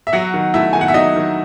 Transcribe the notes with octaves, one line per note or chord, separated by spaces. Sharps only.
E5
F#3 F#4 F#5
D#3
A3 E4 E5
D#3 G#5
F#5
E5
F#3 D#4 D#5
D#3